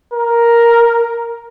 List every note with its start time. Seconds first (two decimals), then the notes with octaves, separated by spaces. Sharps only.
0.13 A#4